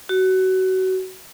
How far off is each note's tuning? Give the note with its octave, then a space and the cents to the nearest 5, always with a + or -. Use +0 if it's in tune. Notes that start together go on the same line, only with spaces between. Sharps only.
F#4 +25